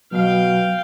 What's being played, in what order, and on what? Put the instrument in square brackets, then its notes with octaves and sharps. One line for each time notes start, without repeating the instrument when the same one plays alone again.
[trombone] B2 [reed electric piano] F#3 [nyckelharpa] F5 G5